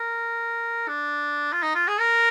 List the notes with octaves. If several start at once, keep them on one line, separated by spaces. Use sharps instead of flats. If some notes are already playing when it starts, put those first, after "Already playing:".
Already playing: A#4
D4
F4
D#4
F4
G#4
A#4